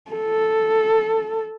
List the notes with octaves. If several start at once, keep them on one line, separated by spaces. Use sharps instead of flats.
A4